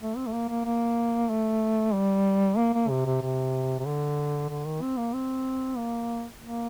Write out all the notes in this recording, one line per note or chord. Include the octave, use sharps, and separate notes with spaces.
A3
C4
A3
A#3
A#3
A#3
A3
G3
A#3
A#3
C3
C3
C3
C3
D3
D3
D#3
C4
A#3
C4
A#3
A#3